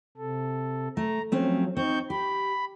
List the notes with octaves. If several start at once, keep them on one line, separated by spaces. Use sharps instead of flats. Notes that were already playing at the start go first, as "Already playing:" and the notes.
C3 A4
A3 A#5
F3 F#3 A3 C4 C#4
C4 D#4 C#6 G6
G4 B5